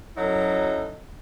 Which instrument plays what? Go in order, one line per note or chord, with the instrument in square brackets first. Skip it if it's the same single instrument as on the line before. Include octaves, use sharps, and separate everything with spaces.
[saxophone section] F#2 F#3 D#4 E4 A4